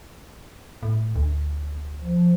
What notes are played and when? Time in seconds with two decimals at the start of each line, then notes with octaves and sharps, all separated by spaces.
0.83 A2
1.16 D2
2.04 F3